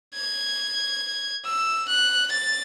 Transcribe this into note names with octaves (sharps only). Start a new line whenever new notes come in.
G#6
E6
F#6
A6